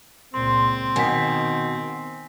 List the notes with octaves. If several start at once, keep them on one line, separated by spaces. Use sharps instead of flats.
C#2 A#2 C4 C6
B2 D#3 G#5 B6